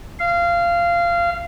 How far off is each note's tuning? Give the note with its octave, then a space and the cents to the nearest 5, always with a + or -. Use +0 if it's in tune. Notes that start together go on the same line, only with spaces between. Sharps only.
F5 -20